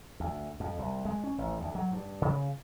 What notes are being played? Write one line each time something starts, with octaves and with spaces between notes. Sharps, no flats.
D2
F2
C2
G#3
C#4
A1
D2
F#3
G2
C#3